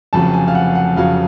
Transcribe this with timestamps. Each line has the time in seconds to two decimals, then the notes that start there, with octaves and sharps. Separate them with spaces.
0.13 F1 F2 C#3 F#3 A5
0.34 G#5
0.48 F5
0.55 F#5
0.75 F#5
0.96 F1 F2 C#3 F#3 F5